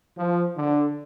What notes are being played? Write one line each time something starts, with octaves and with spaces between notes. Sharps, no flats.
F3
D3